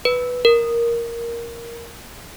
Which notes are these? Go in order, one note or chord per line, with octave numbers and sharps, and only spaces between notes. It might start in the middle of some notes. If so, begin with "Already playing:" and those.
B4
A#4